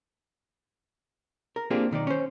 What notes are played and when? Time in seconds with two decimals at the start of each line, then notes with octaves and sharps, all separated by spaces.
1.56 A#4
1.70 A#3 C4 D4 F4 G4 G#4
1.91 B1 D#3 D#4 D5
2.07 C#4 C5